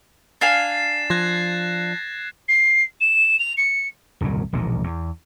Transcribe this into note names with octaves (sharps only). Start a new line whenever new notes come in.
D4 F5 G#5 A6 C7 E7
F3 F#6 G#6 A#6
C7
E7
F7
C#7
D#1 C2 F#2 C#3
E1 A#1 D#2 A#2
E2